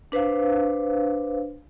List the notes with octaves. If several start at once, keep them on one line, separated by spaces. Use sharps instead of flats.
D4 B4 C5 F5